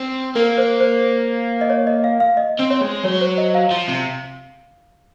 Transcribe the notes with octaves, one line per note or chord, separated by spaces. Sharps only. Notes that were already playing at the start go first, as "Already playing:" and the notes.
Already playing: C4
A#3 A#4
C5
C5
D#5
C#5
D#5
F5
F5
D#5
C4
C#5
G#3
F#3 C#5
C5
D#5
F5
F3
C3